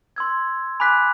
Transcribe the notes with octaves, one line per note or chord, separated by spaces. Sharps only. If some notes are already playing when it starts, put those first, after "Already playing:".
C6 E6 G#6
G#5 B5 D6 F#6 B6